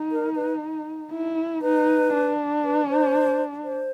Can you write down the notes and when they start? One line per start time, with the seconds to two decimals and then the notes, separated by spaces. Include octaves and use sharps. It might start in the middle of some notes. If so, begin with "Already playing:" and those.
Already playing: D#4
0.12 A#4
0.36 B4
1.11 E4
1.62 D#4 B4
2.13 D4
2.64 B4
2.90 C5
3.64 C5